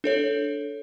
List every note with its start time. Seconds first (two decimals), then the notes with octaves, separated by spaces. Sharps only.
0.04 D4 A4 C#5